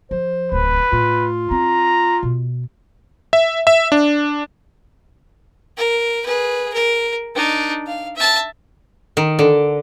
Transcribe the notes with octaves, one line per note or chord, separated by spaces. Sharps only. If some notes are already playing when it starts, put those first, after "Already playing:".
F3 C5
D1 C2 B4
A2 F4
C4 A#5
B2
E5
E5
D4
A#4
G#4 B4
A#4
D4 D#4
F5
E5 A5
D#3
D3